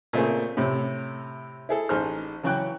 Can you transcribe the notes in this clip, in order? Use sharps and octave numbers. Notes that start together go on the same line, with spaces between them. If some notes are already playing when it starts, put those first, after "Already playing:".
A#2 C#3 A3 C4 G#4
A2 C3
E4 G#4 A4
A1 D#4 G#4 C5 F6
C#3 E3 F#3 F#4 G5 F#6